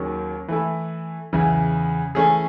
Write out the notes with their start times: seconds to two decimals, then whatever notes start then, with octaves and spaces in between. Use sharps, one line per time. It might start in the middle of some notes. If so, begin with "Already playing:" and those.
Already playing: D#2 D#3 F#3 C#4 G#4
0.48 E3 A3 E4
1.33 E2 C#3 E3
2.15 E3 A3 C#4 G#4